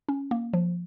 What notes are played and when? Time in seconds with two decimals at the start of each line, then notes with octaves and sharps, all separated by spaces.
0.08 C#4
0.31 A#3
0.53 F3